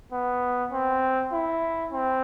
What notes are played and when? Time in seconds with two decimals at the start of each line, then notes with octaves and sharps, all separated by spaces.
0.12 B3
0.72 C4
1.32 E4
1.92 C4